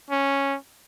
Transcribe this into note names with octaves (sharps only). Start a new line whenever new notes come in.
C#4